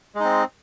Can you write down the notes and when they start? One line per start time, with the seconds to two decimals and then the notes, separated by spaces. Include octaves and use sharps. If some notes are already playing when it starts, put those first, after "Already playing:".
0.15 G#3
0.20 D#4
0.25 C4